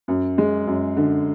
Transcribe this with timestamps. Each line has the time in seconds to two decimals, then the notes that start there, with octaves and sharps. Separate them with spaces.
0.08 F#2
0.38 G#3
0.67 F#2
0.97 D3